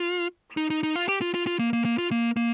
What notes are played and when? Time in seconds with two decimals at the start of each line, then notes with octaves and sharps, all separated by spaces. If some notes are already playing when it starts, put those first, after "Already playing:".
Already playing: F4
0.57 D#4
0.70 D#4
0.83 D#4
0.96 F4
1.09 G4
1.21 F4
1.34 F4
1.47 F4
1.59 A#3
1.73 A#3
1.85 A#3
1.98 F4
2.11 A#3
2.37 A#3